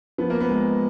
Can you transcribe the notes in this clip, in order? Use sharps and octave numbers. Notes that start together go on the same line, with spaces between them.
F3 B3
A#3
B3
G#3